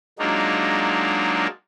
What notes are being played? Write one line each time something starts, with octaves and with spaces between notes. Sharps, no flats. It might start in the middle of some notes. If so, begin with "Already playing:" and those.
F#3 G#3 A#3 D4 D#4 F4